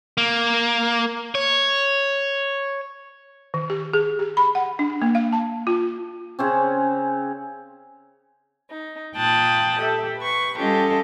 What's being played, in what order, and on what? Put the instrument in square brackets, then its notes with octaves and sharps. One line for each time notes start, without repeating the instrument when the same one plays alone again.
[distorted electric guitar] A#3
C#5
[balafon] D#3
G4
G#4
G4
B5
F#5
D4
A#3
F5
A5
F4
[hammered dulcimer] C#3 C4 C#4
[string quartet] D#4
A#2 F4 G5 A5 D#6 F#6
G4 A4 E5
B4 C#6
G3 C#4 F4 G4 A4 D#5